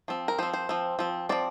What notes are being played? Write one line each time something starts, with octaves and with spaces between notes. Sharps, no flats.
F3 C4
A#4
F3 C4 C5
C5
F3 C4
F3 C4
F3 C4 D5